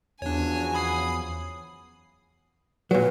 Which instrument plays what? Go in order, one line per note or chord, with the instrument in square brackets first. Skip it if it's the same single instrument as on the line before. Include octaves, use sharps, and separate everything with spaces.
[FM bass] E2 [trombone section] C#3 F3 F#3 [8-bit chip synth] D4 C#5 [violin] G#5
[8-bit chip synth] B5 D#6 C7
[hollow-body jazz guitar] A#2 F#3 [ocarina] B4